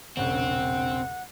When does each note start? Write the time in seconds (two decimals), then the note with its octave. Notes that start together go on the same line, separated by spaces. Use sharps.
0.17 E1 A#1 C#3 C4 F#5